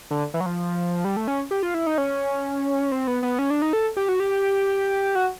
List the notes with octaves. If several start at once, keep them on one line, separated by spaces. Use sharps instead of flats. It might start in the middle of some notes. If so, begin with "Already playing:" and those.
D3
E3
F#3
F3
G3
A3
C#4
G4
F4
E4
D#4
C#4
C4
B3
B3
C#4
D4
D#4
A4
G4
F#4
G4
F#4